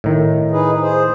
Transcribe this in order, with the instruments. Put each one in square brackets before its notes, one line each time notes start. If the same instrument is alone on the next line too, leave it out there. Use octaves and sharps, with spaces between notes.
[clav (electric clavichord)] A2 D#3
[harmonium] D#4 G#4 B4
G#4 C5